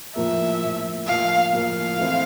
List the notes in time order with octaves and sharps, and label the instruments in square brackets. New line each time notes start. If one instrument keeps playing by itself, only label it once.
[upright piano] A2 F3 A#3 [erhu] E5
[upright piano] A2 F3 A#3
[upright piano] A2 F3 A#3 [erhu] F5
[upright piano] A2 F3 A#3 [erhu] F5
[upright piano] E3 A3 C4 E4